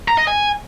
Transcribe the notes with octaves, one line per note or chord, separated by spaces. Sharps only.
A#5
D#5
G#5